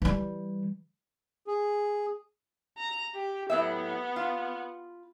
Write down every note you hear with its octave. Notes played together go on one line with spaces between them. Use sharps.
E3 G3
G#4
A#5
G4
A2 F#3 B3 E5
F4